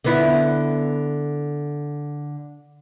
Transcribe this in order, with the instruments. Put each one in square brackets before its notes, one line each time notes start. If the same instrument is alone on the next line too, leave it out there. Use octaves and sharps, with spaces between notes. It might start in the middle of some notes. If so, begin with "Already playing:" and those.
[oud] D3 B3 E4